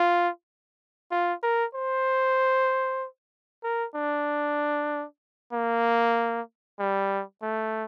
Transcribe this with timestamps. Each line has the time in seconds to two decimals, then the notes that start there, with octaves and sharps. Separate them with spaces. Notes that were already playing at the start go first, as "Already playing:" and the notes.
Already playing: F4
1.11 F4
1.43 A#4
1.75 C5
3.64 A#4
3.95 D4
5.53 A#3
6.79 G3
7.42 A3